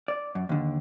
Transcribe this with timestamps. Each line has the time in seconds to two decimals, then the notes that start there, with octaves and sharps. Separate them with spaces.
0.08 D5
0.35 F#2
0.49 D#2 D3